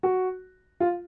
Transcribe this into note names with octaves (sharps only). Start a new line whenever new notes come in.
F#4
F4